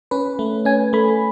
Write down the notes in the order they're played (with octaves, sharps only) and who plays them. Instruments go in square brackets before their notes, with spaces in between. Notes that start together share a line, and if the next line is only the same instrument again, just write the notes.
[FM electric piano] C#4 B4
A3
C#4 G#5
A3 B5